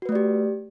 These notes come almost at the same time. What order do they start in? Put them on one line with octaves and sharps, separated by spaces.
F#4 B4 A3 D5 G4